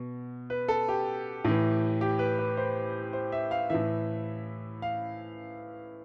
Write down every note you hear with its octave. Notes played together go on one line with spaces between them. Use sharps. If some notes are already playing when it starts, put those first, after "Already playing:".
Already playing: B2
B4
A4
G4
A2 E3
G4
B4
B4
C5
C5
E5
F5
A2 E3 E5
F5